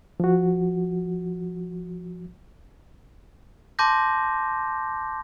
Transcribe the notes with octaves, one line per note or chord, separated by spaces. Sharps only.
F3 F#4
A5 C6 D6 G6 A#6